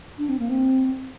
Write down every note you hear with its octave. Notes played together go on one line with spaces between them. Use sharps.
D4
C4
A#3
C4